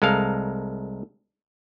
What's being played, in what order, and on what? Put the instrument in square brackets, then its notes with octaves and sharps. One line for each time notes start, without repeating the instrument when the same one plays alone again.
[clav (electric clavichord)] C2 G#3 A4 A#4 F5